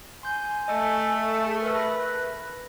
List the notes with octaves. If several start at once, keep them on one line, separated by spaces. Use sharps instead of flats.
G#5 C6 G6
A3 D#5
G#4
A#4 B4 E5
B5 A#6